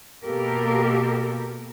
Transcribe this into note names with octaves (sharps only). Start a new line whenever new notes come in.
B2 A#3 G4 A4 A#4